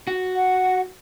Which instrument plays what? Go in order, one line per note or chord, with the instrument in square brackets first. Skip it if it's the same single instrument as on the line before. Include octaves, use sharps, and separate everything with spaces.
[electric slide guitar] F#4
[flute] F#5